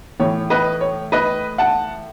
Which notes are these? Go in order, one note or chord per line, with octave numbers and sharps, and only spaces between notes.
A2 E3 C#5
B4 D#5
C#5
B4 D#5
F#5 A5